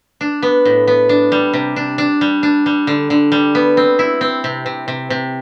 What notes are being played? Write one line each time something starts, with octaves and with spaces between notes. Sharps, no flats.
D4
B3
A2
B3
D4
G3
C3
D4
D4
G3
D4
G3
D3
D3
G3
B3
C4
E4
C4
C3
C3
C3
C3